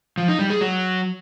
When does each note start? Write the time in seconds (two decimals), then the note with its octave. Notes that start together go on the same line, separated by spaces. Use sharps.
0.18 F3
0.28 D#4
0.39 G3
0.50 G#4
0.61 F#3